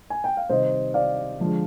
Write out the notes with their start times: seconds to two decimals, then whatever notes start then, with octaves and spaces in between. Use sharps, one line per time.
0.10 G#5
0.24 G5
0.37 F5
0.50 C3 D#3 G3 C5 D#5
0.94 D5 F5
1.40 D3 F3 G#3